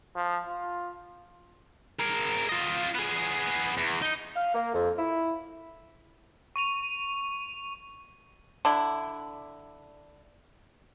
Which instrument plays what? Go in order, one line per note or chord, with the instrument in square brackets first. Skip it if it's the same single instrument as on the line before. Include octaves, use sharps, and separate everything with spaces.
[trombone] F3
F4
[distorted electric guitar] G#4 A#4
F4 D#5
B3 G#4
E2
D#4
[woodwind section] F5
A#3
F2
E4
[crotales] C#6 D#7 F7
[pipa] D3 D4 E4